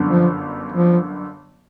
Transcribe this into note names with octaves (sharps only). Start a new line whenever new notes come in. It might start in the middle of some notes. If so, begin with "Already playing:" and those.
Already playing: G1 F#2 D3
F3
F3